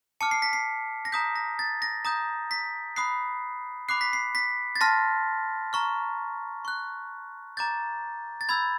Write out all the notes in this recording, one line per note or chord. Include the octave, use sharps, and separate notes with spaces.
A5 D6 F6 C#7
C7
B6
C7
A#6
A#5 D#6 G6 B6
A#6
A6
A#6
A#5 D#6 G6 A#6
B6
B5 D#6 F#6 C7
B5 D6 F#6 C7
B6
C7
B6
A6
A5 C6 F6 A#6
A#5 C#6 F6
C#6 F#6
A#5 D6 G6 A6
A6
B5 E6 G6 G#6